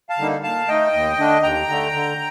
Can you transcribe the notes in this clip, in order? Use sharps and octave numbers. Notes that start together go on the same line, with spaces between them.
F5 A5
D3 G3 A#3 D#4
A#2 F5 A5
A3 D#4 D#5 G5
D#2
D3 A3 D4
D#2 G5 A#5
D3 A3
D3